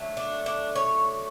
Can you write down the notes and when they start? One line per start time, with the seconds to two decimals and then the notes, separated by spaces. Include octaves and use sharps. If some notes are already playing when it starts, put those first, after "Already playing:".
Already playing: D3 F#3 A3
0.17 D4
0.46 D4
0.76 C#5